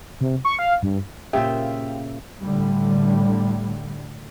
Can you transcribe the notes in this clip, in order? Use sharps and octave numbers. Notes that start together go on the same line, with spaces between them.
C3
C#6
F5
G2
A#2 C#3 A#3 F4 G4 C5 E5
A2 D3 G3